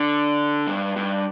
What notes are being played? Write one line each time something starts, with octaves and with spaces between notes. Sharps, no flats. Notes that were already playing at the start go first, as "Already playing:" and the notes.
Already playing: D3
G2
G2